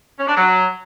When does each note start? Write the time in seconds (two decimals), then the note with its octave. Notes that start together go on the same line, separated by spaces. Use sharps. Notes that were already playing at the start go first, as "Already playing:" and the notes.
0.18 C#4
0.27 D4
0.36 F#3